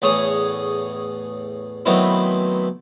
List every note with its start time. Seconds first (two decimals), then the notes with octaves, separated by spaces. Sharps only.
0.02 E2 A2 G#4 C#5 D#6
1.86 D#3 F#3 A3 B3 C4 E4